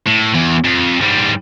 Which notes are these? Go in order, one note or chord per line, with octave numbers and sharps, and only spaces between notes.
A2
E2
F2
G#2 G3